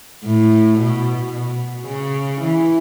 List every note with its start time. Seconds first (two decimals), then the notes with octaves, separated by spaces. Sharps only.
0.25 A2
0.79 B2
1.33 B2
1.86 C#3
2.42 E3